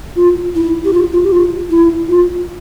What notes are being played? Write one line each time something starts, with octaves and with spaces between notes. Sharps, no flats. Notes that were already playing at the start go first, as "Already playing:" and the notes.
F4
E4
G4
F4
F4
G4
F4
E4
F4